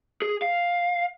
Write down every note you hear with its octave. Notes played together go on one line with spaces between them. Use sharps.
G#4
F5